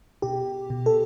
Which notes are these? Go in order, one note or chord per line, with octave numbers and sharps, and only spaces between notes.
B2 G4
B2
A4